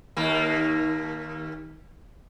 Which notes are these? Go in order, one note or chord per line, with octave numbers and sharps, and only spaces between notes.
D#2 A#3